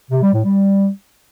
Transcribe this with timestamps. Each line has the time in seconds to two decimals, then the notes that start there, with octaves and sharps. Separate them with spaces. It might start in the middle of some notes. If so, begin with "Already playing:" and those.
0.11 C3
0.22 G3
0.33 A2
0.45 G3